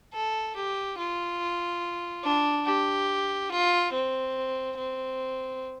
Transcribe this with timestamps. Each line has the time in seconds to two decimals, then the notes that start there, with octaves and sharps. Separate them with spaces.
0.14 A4
0.56 G4
0.98 F4
2.24 D4
2.66 G4
3.51 F4
3.93 C4
4.77 C4